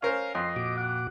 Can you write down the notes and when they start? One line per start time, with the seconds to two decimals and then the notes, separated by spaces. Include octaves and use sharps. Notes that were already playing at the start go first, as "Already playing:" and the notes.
0.02 C#4 A#4 C5 F5
0.35 F2 D#5 C6
0.56 A#2 F#4 D6
0.78 F#5